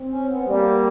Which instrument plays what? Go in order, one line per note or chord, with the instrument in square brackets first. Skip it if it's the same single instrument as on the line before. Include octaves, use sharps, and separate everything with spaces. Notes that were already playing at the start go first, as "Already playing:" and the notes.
Already playing: [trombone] C4
[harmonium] C#4
B3
[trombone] G3 [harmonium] A#3